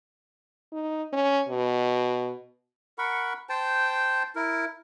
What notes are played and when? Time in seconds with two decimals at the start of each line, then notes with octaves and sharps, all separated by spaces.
0.73 D#4
1.13 C#4
1.48 B2
2.98 A#4 F#5 B5 C#6
3.49 C5 G5 A5
4.36 E4 A#4